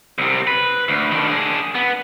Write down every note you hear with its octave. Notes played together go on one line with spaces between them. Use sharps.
C2 C3
B4
D2
D#3 D4
D4 G#4
B3